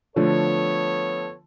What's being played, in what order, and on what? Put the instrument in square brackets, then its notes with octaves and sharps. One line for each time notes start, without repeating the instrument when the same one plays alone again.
[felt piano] D3 F3 A3 [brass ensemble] B3 A4 C#5